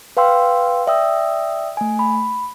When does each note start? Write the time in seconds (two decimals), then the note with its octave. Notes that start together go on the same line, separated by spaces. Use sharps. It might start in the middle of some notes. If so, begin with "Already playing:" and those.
0.17 B4 F5 G5 C6 E6
0.87 D5 E5 G5 D#6 E6
1.77 A3 G#5
1.99 B5